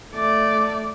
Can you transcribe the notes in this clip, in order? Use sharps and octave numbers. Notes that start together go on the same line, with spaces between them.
A3 D5